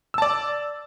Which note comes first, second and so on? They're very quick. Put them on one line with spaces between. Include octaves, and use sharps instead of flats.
E6 A5 D5